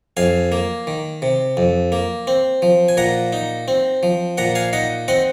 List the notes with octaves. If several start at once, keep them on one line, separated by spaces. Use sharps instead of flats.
F2 F5 G#5
A#3
D#3
C3
F2
A#3
C4
F3
G#5
A#2 F#5 A#5
D#4
C4
F3
A#2 F#5 A#5
F5 G#5
D#4 D#5 F#5
C4 D#5 F#5